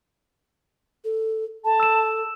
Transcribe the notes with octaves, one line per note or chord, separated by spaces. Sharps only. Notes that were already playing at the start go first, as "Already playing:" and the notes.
A4
A4 A5
E6 E7